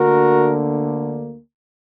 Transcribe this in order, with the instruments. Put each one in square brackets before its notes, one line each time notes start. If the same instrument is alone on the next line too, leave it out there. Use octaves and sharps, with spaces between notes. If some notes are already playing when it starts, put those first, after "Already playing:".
Already playing: [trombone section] D2 D3 A#3 F#4 A#4